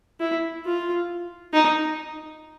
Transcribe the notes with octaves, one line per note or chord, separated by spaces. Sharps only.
E4
F4
D#4